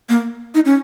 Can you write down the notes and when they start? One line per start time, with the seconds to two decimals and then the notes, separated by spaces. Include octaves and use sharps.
0.09 A#3
0.55 D#4
0.65 C#4